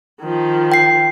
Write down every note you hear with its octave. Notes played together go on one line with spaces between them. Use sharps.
D#3 F3
G5 C7